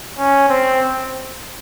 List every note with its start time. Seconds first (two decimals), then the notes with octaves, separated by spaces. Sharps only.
0.19 C#4
0.49 C4